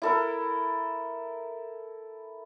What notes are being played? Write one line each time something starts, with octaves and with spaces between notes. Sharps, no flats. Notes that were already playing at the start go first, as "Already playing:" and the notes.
E4 A4 A#4